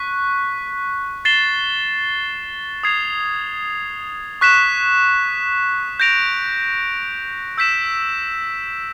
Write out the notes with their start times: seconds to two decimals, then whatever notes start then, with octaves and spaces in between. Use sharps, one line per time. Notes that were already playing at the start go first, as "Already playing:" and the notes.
Already playing: C#6 F#6 B6
1.25 A6 C7 E7 G7
2.83 D#6 G#6 C7 F7
4.41 C#6 F#6 B6 E7
6.00 G6 A#6 D7 F7
7.58 E6 G6 B6 E7